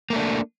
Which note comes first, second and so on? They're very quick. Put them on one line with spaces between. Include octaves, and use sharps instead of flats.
A#3 A3 D4